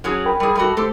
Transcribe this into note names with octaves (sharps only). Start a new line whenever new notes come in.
F#3 C#4 G#4
A#4 G5 B5
G3 G#4
G3 A3 F#4
A3 G4 A4 C5